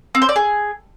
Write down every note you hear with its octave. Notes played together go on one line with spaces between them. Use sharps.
C4
C5
D5
G#4